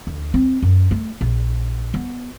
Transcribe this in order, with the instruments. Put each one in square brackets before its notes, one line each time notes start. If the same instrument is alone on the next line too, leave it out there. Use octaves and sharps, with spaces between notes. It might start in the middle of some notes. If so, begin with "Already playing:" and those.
[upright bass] D2
C4
F#2
A3
A#1
B3